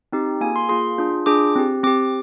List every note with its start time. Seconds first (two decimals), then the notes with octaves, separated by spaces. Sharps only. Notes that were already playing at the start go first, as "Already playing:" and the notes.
0.12 C4 D#4 G4
0.41 A#3 F4 G#4 G#5
0.56 C6
0.69 A#3 F4 G#4 C6
0.98 D4 F4 G#4
1.26 D4 F4 G#4 D6
1.55 C4 G4
1.83 C4 G4 D6